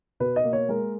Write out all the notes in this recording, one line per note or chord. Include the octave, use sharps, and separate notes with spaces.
B2 B4
D#5
A#3
C#5
G#3 A#4